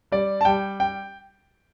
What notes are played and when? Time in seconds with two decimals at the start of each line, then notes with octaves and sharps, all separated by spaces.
0.12 G3 D5
0.41 A5
0.45 G3 G5
0.80 G5